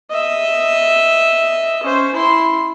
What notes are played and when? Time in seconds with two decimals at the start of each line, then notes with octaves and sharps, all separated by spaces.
0.10 D#5 E5
1.84 C#4 C5
2.14 E4 C6